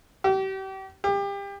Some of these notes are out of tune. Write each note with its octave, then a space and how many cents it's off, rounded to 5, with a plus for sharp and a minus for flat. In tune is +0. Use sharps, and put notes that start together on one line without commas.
G4 -35
G4 +30